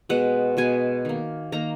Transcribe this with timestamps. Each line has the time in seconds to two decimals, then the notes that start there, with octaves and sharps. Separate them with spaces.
0.09 B2 G#3 B3 F#5
0.57 B2 G#3 B3 G#5
1.05 D#3 A#3
1.52 D#3 A#3 A#5